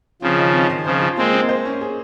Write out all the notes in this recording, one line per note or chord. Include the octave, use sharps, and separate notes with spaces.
C#3 F3 C4
D#3
C4
D#3
C#3 F3 C5
F4
G#3 A#3 C4
A#3
C5
C#4
G#4